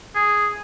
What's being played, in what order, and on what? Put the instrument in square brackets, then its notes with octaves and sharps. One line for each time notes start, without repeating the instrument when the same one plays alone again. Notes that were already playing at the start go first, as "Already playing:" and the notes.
[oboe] G#4